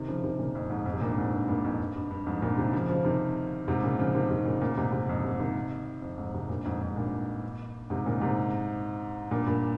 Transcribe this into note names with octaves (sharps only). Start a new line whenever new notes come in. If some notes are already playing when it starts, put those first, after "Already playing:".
Already playing: C3 D#3
C#3 F3
C3 D#3
A#2 C#3
F2
F2 G#2
F2 G#2
C3
G2 A#2
G2
F2 G#2
G2
G2 A#2
F2 G#2
G2
G2
G2
F2 G#2
G2 A#2
C3 D#3
C#3 F3
C#3 F3
C3 D#3
G#2 C3
A#2 C#3
C#3 F3
C3 D#3
C3 D#3
A#2 C#3
A#2 C#3
G#2 C3
G#2 C3
F2 G#2
G#2 C3
C3 D#3
F2
F2 G#2
G#2 C3
G2 A#2
F2 G#2
F2 G#2
G2 A#2
G#2 C3
A#2 C#3
G#2 C3
G2 A#2
G2 A#2